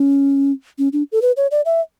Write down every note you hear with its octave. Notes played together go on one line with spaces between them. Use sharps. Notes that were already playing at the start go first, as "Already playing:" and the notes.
Already playing: C#4
C#4
D4
A4
B4
C#5
D5
E5